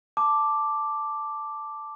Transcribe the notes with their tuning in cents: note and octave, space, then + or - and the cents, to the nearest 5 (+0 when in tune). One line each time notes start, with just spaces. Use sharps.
A5 +0 D6 +0